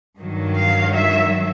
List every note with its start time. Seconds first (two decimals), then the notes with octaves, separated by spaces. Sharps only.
0.17 G2 D#3 F#3
0.56 F5
0.94 E5